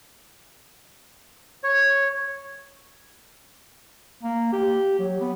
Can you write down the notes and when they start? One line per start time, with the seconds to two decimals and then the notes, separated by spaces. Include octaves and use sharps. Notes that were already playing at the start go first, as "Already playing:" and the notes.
1.64 C#5
4.23 A#3
4.52 G4
4.99 F#3
5.20 B3